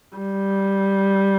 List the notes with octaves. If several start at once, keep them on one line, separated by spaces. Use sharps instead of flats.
G3